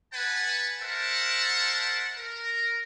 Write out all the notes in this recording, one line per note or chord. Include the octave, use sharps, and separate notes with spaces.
B4 F#5 G#5 A5
A#4 C5 E5 F#5 A5
A#4